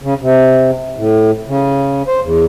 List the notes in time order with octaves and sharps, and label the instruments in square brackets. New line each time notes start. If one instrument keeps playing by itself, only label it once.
[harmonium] C#3
C3
A2
C#3
C5
E2